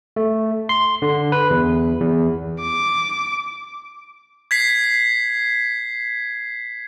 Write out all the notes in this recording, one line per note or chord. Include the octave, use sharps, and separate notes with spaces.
A3
C6
D3
B4
E2
E2
D6
G#6 B6 C7